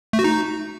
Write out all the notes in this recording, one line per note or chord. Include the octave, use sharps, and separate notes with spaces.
A3
F#4
D#4